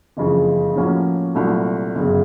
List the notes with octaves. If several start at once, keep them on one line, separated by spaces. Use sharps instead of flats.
F#1 F2 C#3 E3
A2 F3 A#3 C#4 F#4
C2 A#2 F#3 A3
G1 F#2 C#3